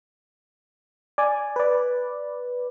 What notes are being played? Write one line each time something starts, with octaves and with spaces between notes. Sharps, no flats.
D5 G#5
B4 D5